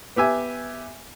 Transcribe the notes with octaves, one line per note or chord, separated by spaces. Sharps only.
B3 G4 E5 G#5